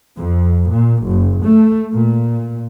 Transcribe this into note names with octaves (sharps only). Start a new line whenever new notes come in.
F2
A#2
F#1
A3
A#2